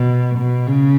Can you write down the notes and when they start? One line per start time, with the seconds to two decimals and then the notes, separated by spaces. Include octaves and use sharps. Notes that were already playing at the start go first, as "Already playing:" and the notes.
Already playing: B2
0.38 B2
0.67 C#3